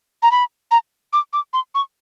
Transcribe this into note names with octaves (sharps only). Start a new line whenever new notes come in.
A#5
B5
A#5
D6
D6
C6
C#6